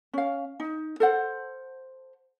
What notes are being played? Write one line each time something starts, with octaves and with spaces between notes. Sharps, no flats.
C#4 F5
D#4
A4 C5 F#5